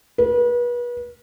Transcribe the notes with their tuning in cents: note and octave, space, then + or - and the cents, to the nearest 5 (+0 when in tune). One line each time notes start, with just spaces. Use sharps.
B4 -35